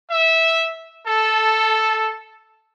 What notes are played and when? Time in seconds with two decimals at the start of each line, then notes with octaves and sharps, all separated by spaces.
0.10 E5
1.06 A4